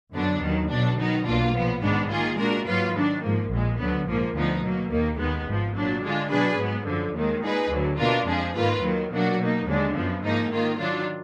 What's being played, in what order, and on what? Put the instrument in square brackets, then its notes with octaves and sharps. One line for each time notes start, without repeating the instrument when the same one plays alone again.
[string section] F#2 D3 F#3 B3 D4
D#2 D#3 F#3
B1 B2 F#3 D4
D#3 F#3 B3 D#4
B1 B2 A#3 D4 F4
A#2 F3 B3
G#2 D#3 G#3 B3 D4
D#3 A#3 F4 G#4
A#2 G#3 D4 F#4 A#4
G#2 F#3 A#3 F4 B4
D#3 F#3 D4
G#2 F3 A#3
A#1 A#2 G#3
D2 D3 F#3 B3
A#1 G#2 F3 A#3
D2 D3 F3 B3 D#4
B2 F#3 A#3
D#2 D#3 A#3
D#2 D#3 G#3 B3
G#1 G#2 F3
A#2 F#3 D4
D3 G#3 D4 F4
B2 F#3 D4 G#4 B4
G#2 F#3 B3
F#2 D3 F3
D#2 D#3 G#3
A#2 G#3 D#4 G#4 B4
D2 D3 F#3
B2 A#3 D4 F4 A#4
F2 F3 G#3 D4 G#4
G#2 D#3 A#3 F4 B4
D#2 D#3 F#3
B2 F#3 A#3 D4 F#4
B2 A#3 D#4
D#2 D3 G#3 D4
F#2 F3 B3
G#2 F3 A#3 D#4
D#3 A#3 F4
D#3 F#3 D4 F4